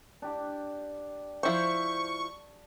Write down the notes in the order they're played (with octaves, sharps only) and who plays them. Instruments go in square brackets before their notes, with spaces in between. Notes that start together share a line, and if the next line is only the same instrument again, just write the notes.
[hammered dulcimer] D4 G4 D6
[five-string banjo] F3 E4 C5 [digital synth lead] C#6